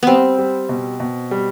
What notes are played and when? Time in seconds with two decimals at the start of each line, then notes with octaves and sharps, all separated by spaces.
0.03 G3 B3 C4
0.38 G3
0.69 B2
1.00 B2
1.31 G3